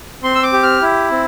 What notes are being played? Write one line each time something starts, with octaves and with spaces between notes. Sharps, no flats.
C4 C6
E6
D6
G4
F6
E4
C4